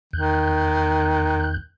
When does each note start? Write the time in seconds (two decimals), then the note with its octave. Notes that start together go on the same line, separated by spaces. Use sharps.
0.13 E2 D#3 F#6 G6